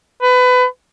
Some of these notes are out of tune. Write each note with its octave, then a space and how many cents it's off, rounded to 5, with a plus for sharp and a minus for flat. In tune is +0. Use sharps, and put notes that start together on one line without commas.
B4 +25